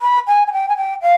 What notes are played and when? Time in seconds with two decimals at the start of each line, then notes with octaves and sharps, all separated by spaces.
0.02 B5
0.27 G#5
0.47 G#5
0.52 G5
0.68 G#5
0.76 G5
1.01 F5